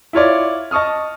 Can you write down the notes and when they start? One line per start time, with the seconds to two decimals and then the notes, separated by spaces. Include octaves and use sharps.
0.13 E4 F4 C#5 D5
0.71 D#5 A5 C#6 D#6 F6